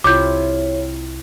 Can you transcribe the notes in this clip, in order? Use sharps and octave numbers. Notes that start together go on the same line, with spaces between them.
C2 C3 E4 F4 C#5 D6 G6